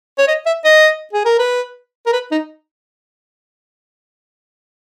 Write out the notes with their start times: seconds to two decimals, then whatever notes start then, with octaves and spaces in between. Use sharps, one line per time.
0.19 C#5
0.28 D#5
0.46 E5
0.65 D#5
1.13 G#4
1.26 A#4
1.39 B4
2.06 A#4
2.13 B4
2.32 D#4